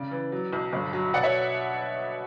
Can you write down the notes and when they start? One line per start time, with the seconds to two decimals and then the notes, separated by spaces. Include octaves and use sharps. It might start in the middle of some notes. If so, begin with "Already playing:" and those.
Already playing: C#3 D5
0.11 E3
0.32 F#3
0.53 B1
0.73 G1
0.93 F#3
1.13 B2 D5 F#5
1.23 C#5 E5